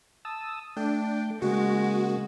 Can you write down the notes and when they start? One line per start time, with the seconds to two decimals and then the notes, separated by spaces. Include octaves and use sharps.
0.25 A5 D#6 E6
0.77 A3 D4 G5
1.42 C#3 G#3 A#3 F#4